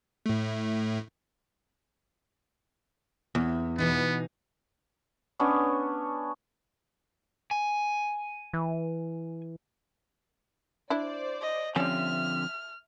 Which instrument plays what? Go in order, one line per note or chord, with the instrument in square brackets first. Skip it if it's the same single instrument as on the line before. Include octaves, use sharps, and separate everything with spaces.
[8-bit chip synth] A2 A3
[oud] E2
[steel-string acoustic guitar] B2 E3 D#4 [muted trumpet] B3
[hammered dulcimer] B3 C#4 D4 C#5
[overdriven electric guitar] G#5
[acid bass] E3
[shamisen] D4 E4 [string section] C5 D5
[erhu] D#5
[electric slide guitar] D3 F3 C4 [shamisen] G3 C#4 [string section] E5 [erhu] F6